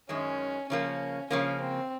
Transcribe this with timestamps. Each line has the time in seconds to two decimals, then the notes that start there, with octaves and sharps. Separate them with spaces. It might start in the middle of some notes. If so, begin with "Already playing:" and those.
0.09 F#2 D#3 G#3 C#4
0.69 C#3 F3 A#3 C#4
1.30 C#3 F3 A#3 C#4
1.61 C4